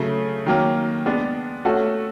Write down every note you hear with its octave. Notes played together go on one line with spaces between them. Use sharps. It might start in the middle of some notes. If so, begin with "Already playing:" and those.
Already playing: C#3 F#3 A3
D#3 F#3 A#3
G#3 B3 D4
A3 C#4 F#4 A4